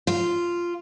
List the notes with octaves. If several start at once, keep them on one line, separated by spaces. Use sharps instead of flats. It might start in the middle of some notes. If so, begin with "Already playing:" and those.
F4